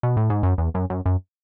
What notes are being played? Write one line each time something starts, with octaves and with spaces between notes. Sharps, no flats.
B2
A2
G#2
F#2
E2
F#2
F#2
F#2